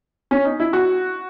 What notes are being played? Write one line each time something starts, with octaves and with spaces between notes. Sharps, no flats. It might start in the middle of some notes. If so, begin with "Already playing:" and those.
C#4
D#4
E4
F#4